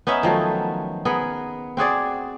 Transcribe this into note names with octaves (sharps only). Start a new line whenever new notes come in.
B3 C#4 D#4 E5
D#3 F3 F#3 A3
B3 G#4 A#4
C4 F#4 G#4 D5